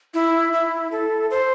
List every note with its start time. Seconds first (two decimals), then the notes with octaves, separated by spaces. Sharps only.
0.14 E4
0.53 E4
0.92 A4
1.31 C5